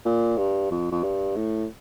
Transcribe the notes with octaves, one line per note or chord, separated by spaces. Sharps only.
A#2
G2
F2
F2
G2
A2